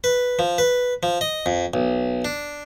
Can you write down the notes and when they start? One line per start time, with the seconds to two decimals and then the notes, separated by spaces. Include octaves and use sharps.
0.04 B4
0.39 F3
0.58 B4
1.03 F3
1.21 D#5
1.46 F2
1.74 B1
2.25 D4